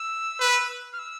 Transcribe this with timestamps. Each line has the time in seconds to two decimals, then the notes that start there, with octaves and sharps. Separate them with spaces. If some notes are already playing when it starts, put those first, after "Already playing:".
Already playing: E6
0.40 B4
0.93 F6
0.99 E6